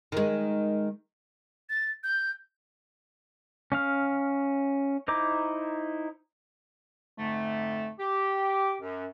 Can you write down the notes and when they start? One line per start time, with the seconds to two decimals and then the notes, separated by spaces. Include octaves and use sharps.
0.12 D#3 G#3
1.70 A6
2.04 G6
3.72 C#4 F5 F6
5.08 D#4 E4 C5 A#5 D6
7.18 F2 G#2 D3 A3
7.99 G4
8.81 F#2